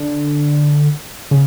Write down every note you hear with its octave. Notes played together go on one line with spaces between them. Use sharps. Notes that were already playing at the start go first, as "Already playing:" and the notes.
Already playing: D3
C#3